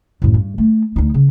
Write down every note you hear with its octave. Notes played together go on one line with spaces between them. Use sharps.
F#2 A2
G2
A3
D2 D#4
C#3